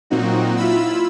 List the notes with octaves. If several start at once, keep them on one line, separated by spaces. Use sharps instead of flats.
A#2 F#3 A#3 C4 D#4 F#4
E4 F4 B5 E6